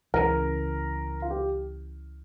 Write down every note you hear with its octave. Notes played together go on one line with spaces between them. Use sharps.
C#2 C#3 E3 A#4
F4
G4